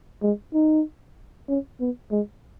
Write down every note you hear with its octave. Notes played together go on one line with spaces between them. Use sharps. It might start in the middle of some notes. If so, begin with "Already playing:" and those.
G#3
D#4
C#4
B3
G#3